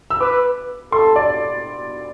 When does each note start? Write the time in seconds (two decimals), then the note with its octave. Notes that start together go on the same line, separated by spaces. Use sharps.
0.10 E6
0.21 B4 D6
0.92 A4 C6
1.16 D5